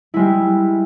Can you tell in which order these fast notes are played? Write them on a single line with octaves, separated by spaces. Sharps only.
E4 G#3 G3